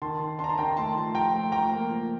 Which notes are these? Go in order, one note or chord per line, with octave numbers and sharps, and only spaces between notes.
D#3 A5 C6
D#3
D4 A5 C6
A#5
A5 C6
D#3 G5 A#5
A3 A5 C6
F3
F3 G5 A#5
A3
F3 G5 A#5
A#3
F3